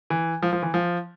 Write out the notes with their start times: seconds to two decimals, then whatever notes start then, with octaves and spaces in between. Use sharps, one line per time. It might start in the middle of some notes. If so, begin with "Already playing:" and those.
0.10 E3
0.42 F3
0.53 F3
0.62 E3
0.74 F3